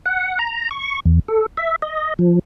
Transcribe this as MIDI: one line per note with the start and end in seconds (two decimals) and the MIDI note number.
0.06 0.39 78
0.39 0.69 82
0.71 1.00 85
1.05 1.20 40
1.28 1.46 69
1.57 1.76 76
1.82 2.14 75
2.19 2.39 53